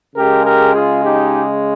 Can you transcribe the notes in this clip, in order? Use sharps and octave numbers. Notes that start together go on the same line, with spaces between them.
C#3 G#3 G4 A#4
G4 A#4
F4 G#4
D#4 G4